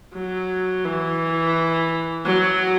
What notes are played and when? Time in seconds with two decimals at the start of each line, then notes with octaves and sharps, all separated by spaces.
0.15 F#3
0.85 E3
2.25 F#3